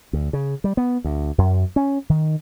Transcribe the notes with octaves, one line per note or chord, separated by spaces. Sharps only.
D2
C#3
G3
B3
D2
F#2
C#4
D#3